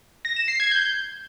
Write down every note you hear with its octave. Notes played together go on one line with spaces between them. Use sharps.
A#6
E7
C7
G#6
G6